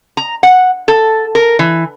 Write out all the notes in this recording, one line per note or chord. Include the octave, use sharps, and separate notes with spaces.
A#5
F#5
A4
A#4
E3